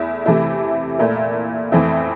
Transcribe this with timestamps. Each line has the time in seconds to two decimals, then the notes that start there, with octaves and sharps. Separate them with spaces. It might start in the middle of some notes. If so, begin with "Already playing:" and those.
Already playing: E2 A3 E4
0.26 C3 E3 A3 E4
0.99 A#2 A3 E4 A#4
1.72 F2 E3 A3 C4 E4